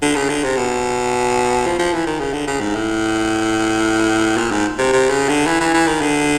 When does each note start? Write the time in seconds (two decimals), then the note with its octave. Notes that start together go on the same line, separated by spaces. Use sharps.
0.02 D3
0.15 C#3
0.29 D3
0.44 C3
0.57 B2
1.66 F3
1.79 F3
1.93 E3
2.07 D#3
2.20 C#3
2.33 D3
2.47 C#3
2.60 G#2
2.75 A2
4.37 A#2
4.51 G#2
4.78 C3
4.93 C3
5.10 C#3
5.29 D3
5.46 E3
5.60 E3
5.74 E3
5.87 D#3
6.01 D3